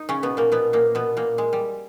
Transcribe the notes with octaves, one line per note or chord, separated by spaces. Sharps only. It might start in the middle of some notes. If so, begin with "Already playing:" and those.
Already playing: D#4
C#3 C#4
B2 B3
A#2 A#3
B2 B3
A#2 A#3
B2 B3
A#2 A#3
G#3
G3